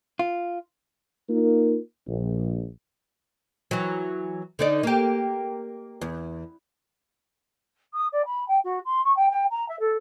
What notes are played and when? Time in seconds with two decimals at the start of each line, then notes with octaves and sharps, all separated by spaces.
0.19 F4
1.30 A#3 D#4 F4 A#4
2.07 A#1
3.71 E3 F#3
4.59 D3 D#4 D5
4.83 A#3 G4
6.01 E2
7.93 D#6
8.12 D5
8.25 B5
8.48 G5
8.64 F#4
8.84 C6
9.04 C#6
9.16 G5
9.30 G5
9.50 A#5
9.68 E5
9.79 A4